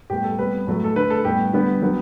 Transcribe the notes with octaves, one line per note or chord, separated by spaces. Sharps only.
A2 G3 B3 G4
A4
C3 G3 B3 B4
A2 F#3 A3
A4
D3 A3 B4
A4
A2 G3 B3 G4
D3 G3 B3
D3 F#3 B3